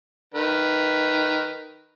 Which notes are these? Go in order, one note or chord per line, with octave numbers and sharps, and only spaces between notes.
D#3 B4